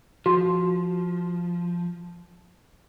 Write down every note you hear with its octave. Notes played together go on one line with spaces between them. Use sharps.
F3 F#4